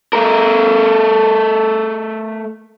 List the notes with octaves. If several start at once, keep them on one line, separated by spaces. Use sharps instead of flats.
A3 A#4